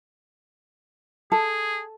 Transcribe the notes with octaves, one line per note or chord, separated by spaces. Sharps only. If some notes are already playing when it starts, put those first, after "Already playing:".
G#4 A4